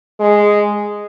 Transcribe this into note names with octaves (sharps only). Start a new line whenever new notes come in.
G#3